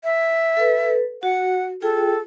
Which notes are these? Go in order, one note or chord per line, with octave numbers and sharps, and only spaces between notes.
E5
A4 B4
F#4 F#5
F4 G#4 A4 G5